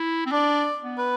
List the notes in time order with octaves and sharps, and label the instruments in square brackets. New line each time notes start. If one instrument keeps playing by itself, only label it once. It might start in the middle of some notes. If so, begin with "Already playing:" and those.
Already playing: [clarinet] E4
C4
[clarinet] D4 [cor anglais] D5
[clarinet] B3
[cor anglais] B4